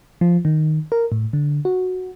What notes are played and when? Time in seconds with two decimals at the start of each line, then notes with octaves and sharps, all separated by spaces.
0.21 F3
0.45 D#3
0.92 A#4
1.12 A2
1.33 D3
1.65 F#4